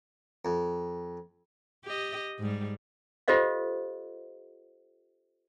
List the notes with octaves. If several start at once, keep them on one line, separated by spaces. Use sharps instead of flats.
F2
G4 D#5
G#2 G3
F4 G4 A4 C5 D#5 F5